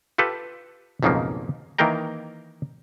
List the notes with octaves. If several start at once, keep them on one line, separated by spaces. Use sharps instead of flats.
F4 G4 A4 B4
B1 F2 G#2 C#3 F3 A#3
D#3 E3 A#3 A#4 G5 A#5